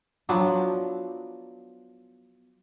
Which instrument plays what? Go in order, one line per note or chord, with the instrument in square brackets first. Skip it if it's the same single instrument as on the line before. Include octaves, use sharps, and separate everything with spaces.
[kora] F3 F#3 B3 D4